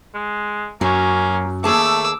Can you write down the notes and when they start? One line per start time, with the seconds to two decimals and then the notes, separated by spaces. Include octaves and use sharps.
0.14 G#3
0.81 F#2 F#3 A#3 C#4
1.64 D#2 A3 G#4 A5 D6 E6